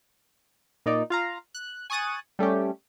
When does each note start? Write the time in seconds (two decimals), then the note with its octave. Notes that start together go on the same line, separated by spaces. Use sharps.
0.86 A#2 D#4 D5
1.10 F4 F5 A#5
1.55 F#6
1.90 G#5 C#6 D#6 F#6 A6 D#7
2.39 G3 A3 C#4 G4